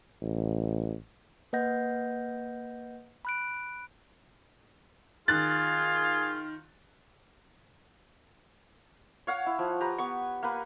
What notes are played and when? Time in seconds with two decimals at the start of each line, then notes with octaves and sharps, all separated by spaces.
0.22 A1
1.53 A#3 B4 D#5 F#5 G6 A#6
3.25 B5 F#6 D7
5.28 D#3 F4 G#4 F#6 A6
9.27 C#5 F5 F#5
9.46 E4
9.59 F3
9.81 G4 B4 A#5
9.98 B3 C#6
10.43 A#3 B4